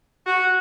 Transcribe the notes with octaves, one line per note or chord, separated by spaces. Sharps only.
F#4